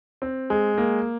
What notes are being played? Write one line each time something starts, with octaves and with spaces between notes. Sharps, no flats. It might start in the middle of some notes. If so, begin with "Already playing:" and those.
C4
G#3
A#3